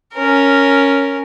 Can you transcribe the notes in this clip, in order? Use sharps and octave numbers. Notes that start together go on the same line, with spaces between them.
C#4 A#4